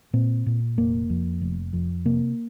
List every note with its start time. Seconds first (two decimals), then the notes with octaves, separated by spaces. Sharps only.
0.13 A#2 C4
0.46 A#2
0.77 F1 A#3
1.10 F2
1.42 F1
1.73 F2
2.05 C3 A#3